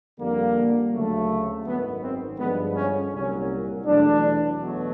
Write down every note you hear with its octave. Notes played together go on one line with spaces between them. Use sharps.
F2 D3 G3 A#3
D2 C#3 F#3 A3
G#1 F#2 D#3 B3
C4
G2 D3 F3 G#3 B3
C#4
C2 A#2 F#3 C#4
E2 B2 F#3 A3 D4
E2 B2 F#3 A3